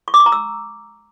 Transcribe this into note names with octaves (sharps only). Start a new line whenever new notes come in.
C#6
D6
C#6
A#5
E6